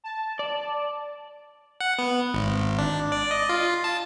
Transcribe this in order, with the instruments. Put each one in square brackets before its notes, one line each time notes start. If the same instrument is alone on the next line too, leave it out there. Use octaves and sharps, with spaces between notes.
[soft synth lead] A5
[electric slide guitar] D5
[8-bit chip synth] F#5
B3
G#1
D4
D5
D#5
F4
A5